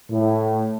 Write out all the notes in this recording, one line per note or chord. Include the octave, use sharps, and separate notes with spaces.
A2